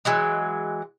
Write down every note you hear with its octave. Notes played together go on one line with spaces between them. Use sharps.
E3 F#3 G#3